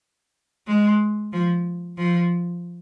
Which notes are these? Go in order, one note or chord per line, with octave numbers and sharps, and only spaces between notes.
G#3
F3
F3